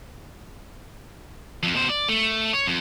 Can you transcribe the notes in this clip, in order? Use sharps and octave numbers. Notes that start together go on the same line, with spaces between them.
F2
B2 C5
D5
A3
C#5
F2